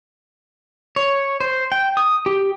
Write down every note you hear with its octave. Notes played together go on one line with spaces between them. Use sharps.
C#5
C5
G5
D#6
G4